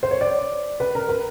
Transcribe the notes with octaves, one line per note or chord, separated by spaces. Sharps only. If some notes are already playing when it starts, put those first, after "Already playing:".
C5
C#5
D5
B4
A#4
B4